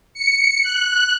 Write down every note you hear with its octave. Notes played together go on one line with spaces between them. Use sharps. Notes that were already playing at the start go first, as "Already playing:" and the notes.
C#7
F#6